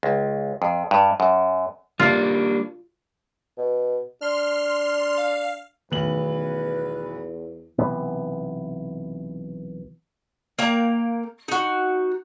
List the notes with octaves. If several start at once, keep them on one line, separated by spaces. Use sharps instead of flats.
C#2
F2
G2
F#2
G3 A#3 D4 F4
B2
D4 C6 F6
F5
B1 E2 D#3 A3 B4 F#7
B1 C3 E3 B3
A#3 G5 A#5
D#4 F#4